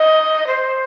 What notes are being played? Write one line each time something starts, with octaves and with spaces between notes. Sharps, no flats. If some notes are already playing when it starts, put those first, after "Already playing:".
Already playing: D#5
C5